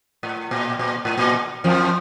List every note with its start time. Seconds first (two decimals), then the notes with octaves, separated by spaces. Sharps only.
0.23 A2
0.51 A#2
0.79 A#2
1.05 A2
1.17 A#2
1.64 F2 F3